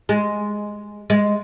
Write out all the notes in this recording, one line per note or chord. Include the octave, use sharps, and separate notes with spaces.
G#3
G#3